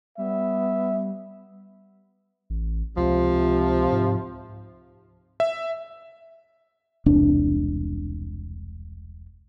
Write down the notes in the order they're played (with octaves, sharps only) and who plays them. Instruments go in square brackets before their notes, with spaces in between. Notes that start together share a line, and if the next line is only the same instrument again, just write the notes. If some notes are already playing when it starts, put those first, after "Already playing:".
[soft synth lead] G3 [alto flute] B3 [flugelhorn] E5
[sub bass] A1
[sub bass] C#2 [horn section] C3 F3
[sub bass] G#2
[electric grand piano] E5
[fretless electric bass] E1 C2 D4